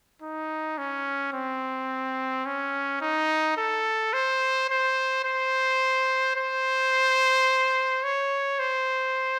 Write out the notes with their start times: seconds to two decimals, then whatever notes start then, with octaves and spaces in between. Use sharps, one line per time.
0.22 D#4
0.78 C#4
1.33 C4
2.46 C#4
3.01 D#4
3.57 A4
4.13 C5
4.69 C5
5.24 C5
6.36 C5
8.03 C#5
8.59 C5